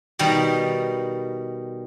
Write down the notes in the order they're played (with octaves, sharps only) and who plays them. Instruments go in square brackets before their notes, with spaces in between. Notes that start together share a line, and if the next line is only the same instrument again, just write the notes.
[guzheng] B2 D#3 G3 G5 A#5